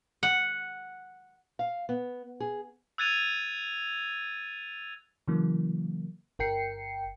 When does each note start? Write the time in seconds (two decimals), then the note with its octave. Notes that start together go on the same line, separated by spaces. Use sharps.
0.23 F#5
1.59 F5
1.89 B3
2.40 G#4
2.98 E6 F#6 G#6 A6 D#7 F7
5.28 C#3 E3 F#3 A#3
6.39 G1 A#4 G5 C7 C#7